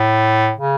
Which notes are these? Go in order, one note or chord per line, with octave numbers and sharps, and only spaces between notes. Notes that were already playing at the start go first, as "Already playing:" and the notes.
Already playing: A2
C#3